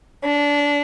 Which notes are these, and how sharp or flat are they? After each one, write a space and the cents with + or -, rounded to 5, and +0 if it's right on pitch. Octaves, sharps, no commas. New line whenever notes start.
D4 -20